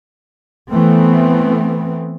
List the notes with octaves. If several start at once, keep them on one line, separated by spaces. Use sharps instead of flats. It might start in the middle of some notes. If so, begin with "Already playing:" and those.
E3 A3 B3 C4